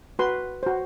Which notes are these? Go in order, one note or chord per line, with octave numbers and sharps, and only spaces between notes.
F#4 B4 C6
F#4 C5